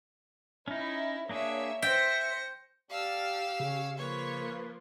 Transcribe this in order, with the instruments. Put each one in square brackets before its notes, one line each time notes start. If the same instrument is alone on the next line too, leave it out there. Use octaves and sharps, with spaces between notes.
[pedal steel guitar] C#4 D#4 [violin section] E4
[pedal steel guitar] A#3 D4 G#4 [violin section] C#5 E5
[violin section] C5 A#6 C#7 [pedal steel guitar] E5 [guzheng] G5
[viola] G4 [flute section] D5 A5 F6 [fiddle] F5 E6
[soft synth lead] C#3 [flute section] C#4
[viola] F3 A#3 [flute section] B4 [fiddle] C#5